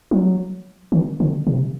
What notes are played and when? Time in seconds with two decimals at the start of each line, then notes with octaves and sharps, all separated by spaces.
0.11 F#3
0.92 D#3
1.20 D3
1.47 C3